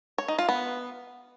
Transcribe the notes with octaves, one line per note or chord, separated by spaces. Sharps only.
C#5
D#4
F4
B3